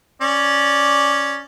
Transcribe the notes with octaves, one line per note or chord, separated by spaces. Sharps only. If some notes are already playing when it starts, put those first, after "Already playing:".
C#4 D5